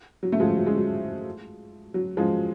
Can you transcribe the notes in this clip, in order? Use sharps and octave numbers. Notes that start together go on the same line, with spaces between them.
F#3
A3
F3 G#3
F#3
G#3
F#3
F#3
F3 G#3